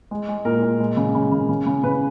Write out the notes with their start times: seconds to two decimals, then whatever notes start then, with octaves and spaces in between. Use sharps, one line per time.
0.11 G#3
0.28 G#3
0.45 A#2 A#4
0.62 A#2
0.80 G#3
0.97 C#3
1.15 C#3
1.32 C#3
1.49 C#3
1.66 C#3
1.84 C#3 B4